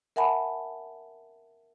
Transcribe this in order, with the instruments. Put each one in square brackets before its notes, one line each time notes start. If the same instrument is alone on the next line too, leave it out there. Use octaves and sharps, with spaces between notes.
[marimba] A#4 E5 F#5 G#5 A5 B5